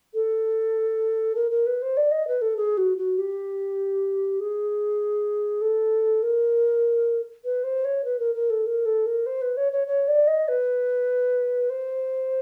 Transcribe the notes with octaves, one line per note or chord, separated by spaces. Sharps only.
A4
A#4
A#4
B4
C5
D5
D#5
B4
A4
G#4
F#4
F#4
G4
G#4
A4
A#4
B4
C5
C#5
B4
A#4
A#4
A4
A#4
A4
A#4
C5
B4
C#5
C#5
C#5
D5
D#5
B4
C5